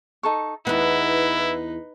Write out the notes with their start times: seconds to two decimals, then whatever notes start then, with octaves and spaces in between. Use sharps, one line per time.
0.23 D#4 A4 C#6
0.67 E2 B3 D#4 E4 B4 F#5